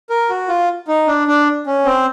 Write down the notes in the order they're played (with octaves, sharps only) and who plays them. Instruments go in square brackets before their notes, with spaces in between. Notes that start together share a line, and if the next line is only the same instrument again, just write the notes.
[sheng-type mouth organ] A#4
F#4
F4
D#4
D4
D4
C#4
C4